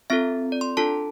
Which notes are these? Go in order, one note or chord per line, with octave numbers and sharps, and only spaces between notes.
C4 F4 A4 E5
D5
C6
D4 F4 A4 A5